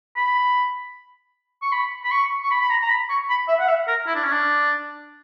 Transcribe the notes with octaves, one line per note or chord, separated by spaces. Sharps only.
B5
C#6
B5
B5
C#6
C#6
B5
B5
A#5
A#5
B5
C#6
B5
E5
F#5
E5
A#4
E4
D4
C#4
D4